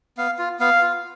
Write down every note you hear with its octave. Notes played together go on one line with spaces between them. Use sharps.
B3 F5
F4
B3 F5
F4